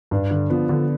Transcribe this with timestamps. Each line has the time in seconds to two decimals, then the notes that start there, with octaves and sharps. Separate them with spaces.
0.11 G2 D4
0.31 D3
0.50 F3 B3
0.69 D3